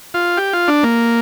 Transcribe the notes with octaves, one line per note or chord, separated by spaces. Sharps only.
F4
G4
F4
D4
A#3